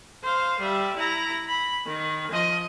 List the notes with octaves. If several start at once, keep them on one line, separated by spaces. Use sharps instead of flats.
C5 F5
G3 E5
E4 A#5
B5
D#3
F3 D#5